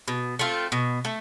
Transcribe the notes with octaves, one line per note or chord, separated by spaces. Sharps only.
B2
A3 C4 F4
B2
A3